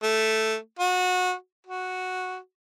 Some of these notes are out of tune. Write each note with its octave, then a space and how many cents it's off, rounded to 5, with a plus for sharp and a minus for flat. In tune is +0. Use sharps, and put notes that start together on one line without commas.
A3 +0
F#4 -25
F#4 -5